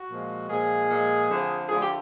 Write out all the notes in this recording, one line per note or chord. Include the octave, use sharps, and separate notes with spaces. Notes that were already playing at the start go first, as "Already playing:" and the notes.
Already playing: F#4
A#2 F3 G#3
A#2 F3 G#3 G#4
A#2 F3 G#3
F2 D3 F3 A3
F2 D3 F3 A3 G#4
G4